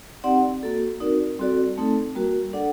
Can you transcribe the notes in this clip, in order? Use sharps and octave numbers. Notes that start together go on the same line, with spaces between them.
C4 D#4 G4 D5 F#5
A#3 F#4 A4
C4 D#4 F#4 A#4 D5
G3 C4 F#4 A4 D5
A3 C4 D#4 A4
G3 A#3 F#4 A#4
D4 A4 D5 F#5